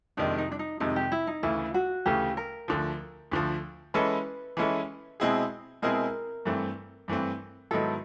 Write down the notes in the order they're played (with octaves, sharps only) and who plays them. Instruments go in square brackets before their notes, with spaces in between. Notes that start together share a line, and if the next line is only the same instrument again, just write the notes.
[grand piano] F2 C3 D#3 G#3 [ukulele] D4
[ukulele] D#4
D4
D#4
[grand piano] F2 C3 D#3 G#3 [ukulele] D#4
[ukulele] G4
E4
D#4
[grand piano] D2 C#3 E3 A3 [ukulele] E4
[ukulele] F#4
[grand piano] D2 C#3 E3 A3 [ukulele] G4
[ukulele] A#4
[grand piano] D2 D3 F3
D2 D3 F3
[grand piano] E3 G#3 C#4 E4 A4 [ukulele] B4
[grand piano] E3 G#3 C#4 E4 A4
B2 G#3 C4 E4 G#4
[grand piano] B2 G#3 C4 E4 G#4 [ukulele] A#4
[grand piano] G2 E3 A3 C4
G2 E3 A3 C4
[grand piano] G#2 D#3 F#3 B3 E4 [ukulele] A4